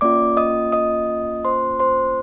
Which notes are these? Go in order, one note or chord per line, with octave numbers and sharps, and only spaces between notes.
A#3 C#4 F4 D5 D6
D#5 D#6
D#5 D#6
C5 C6
C5 C6